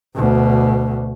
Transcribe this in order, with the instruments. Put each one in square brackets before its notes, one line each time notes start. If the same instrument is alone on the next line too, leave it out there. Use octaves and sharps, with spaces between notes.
[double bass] D2 B2